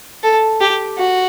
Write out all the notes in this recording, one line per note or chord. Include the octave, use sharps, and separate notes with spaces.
A4
G4
F#4